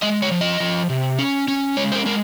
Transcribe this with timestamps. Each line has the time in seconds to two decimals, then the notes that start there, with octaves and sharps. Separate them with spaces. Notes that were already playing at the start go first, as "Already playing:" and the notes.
0.02 G#3 D#5
0.22 C#5
0.31 F3
0.41 D#5
0.60 F3
0.90 C3
1.19 C#4
1.48 C#4
1.77 G#3 C#5
1.92 C5
1.96 A#4
2.06 G#3 A#4